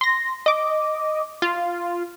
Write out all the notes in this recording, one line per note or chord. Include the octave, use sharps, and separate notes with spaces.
C6 A#6
D#5 D6
F4